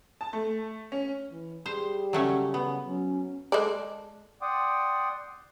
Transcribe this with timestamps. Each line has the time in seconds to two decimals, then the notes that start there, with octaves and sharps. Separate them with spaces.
0.21 A5
0.33 A3
0.92 C#4
1.31 E3
1.66 G3 G#4 C5
2.13 C#3 F#3 A3 C#4
2.54 B3
2.87 F#3 C#4
3.52 G#3 A4 D5
4.42 D5 F#5 G5 C6 D6 D#6